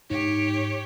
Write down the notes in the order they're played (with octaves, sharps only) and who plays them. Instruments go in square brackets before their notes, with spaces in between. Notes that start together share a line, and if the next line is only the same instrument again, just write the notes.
[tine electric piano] G#2 D#4 [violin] G4 C#5